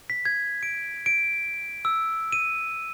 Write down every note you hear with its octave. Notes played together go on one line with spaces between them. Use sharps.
B6
G#6
D7
D7
E6
D#7